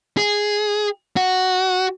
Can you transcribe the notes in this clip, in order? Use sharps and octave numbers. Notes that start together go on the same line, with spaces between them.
G#4
F#4